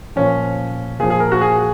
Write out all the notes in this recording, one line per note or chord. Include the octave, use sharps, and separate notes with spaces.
A#2 F3 C#4
A#2 F3 G#4
G#4
A#4
F#4
G#4